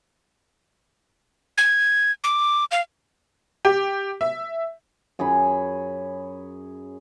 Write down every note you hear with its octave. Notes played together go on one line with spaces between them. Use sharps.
G#6
D6
F5
G4
E5
F#2 G#4 C#5 B5